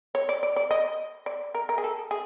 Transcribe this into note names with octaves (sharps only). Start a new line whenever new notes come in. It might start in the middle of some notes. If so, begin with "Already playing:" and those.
C#5
D5
D5
D5
D#5
D5
A#4
A#4
G#4
A4
G#4